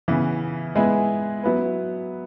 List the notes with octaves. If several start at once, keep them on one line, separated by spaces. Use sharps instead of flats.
C#3 E3 B3
G#3 B3 E4 G#4 B4
F#3 B3 E4 B4